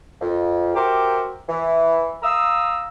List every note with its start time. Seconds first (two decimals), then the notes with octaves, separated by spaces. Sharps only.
0.21 F2
0.75 F#4 G4 A#4 C5 E5 D6
1.49 E3
2.23 F5 A#5 D#6 E6